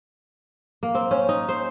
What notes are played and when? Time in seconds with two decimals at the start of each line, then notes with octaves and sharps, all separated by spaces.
0.83 A#3
0.95 C4
1.11 C#4
1.29 D#4
1.49 C5